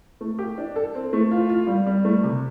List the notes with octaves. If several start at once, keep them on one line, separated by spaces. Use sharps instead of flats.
A3
G4
D4
A4
C4
A3
F4
F4
G3
G3
A3
C3